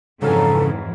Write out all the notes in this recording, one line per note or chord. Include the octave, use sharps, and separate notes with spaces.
F2 G#2 C#3 E3 F#3 A4 F5 G#5